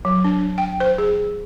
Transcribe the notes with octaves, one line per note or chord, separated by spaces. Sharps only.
F#3
D4
G5
C5
G#4